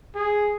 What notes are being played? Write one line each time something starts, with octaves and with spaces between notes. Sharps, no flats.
G#4